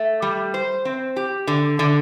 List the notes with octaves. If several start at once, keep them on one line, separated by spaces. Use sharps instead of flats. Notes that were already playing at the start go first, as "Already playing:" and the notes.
Already playing: A3
G3
C5
C4
G4
D3
D3